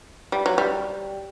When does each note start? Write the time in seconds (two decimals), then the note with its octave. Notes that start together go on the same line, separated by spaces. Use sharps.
0.32 G3
0.46 F#3
0.58 G3